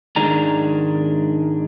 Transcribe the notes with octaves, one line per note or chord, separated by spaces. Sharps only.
G#2 D#3 G#3 D4 A#5